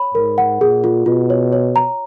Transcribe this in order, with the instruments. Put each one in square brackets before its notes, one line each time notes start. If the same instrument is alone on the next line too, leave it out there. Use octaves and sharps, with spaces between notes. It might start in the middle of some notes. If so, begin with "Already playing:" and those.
Already playing: [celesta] C#5 B5
[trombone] G#2 [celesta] A#4
[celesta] F#5
[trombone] A#2 [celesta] G#4
[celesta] F4
[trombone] B2 [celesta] F4
[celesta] C#5
C#5
A#5